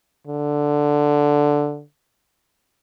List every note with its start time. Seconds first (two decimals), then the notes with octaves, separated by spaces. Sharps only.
0.27 D3